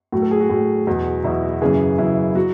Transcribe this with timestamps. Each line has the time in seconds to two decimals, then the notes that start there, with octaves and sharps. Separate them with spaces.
0.12 A2 F#3 F#4
0.22 A4
0.31 G#4
0.40 F#4
0.50 A2 F#3
0.87 E2 B2 F#3
1.24 E2 B2 F#3 E4
1.43 F#4
1.62 F#2 C#3 E3 G#4
1.98 F#2 C#3 E3 E4
2.35 F#3 F#4